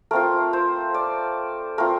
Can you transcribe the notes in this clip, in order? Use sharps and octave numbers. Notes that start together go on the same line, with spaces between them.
A3 C4 F4 A#4
C5
D5
A3 C4 F4 A#4